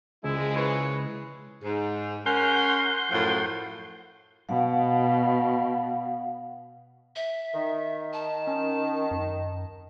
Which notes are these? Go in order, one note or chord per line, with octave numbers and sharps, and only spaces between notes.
C#2 A#2 F3 G#3 E4
E4 B4 C#5
G#2
C#4 A#4 F#5 C6 G6
F#2 A2 F3
B2 F5 F#5
E5
D#3
A5
C#4
F#2